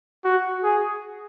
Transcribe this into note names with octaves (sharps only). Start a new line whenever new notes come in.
F#4
G#4